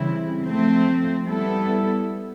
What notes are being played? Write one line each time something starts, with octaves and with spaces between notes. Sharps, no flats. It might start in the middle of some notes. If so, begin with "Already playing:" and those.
Already playing: C#3 E3 G3 C4 E4
F3 A3 C4
G3 B3 E4 A4